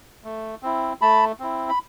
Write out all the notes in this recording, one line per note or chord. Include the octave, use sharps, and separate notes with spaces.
A3
C4 E4
A3 A5 B5
C4 E4
B5